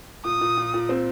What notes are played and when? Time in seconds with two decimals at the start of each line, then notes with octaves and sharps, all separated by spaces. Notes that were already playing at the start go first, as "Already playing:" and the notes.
0.24 A#2 D#6
0.41 A#2
0.57 A#2
0.74 A#2
0.89 C4